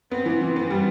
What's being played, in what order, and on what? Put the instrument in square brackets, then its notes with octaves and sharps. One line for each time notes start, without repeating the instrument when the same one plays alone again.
[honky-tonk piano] B3 [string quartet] C4
[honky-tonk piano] E3
E3
B3
G3